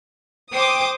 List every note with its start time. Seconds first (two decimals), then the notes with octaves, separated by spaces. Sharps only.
0.53 C5 G5 D6 D#6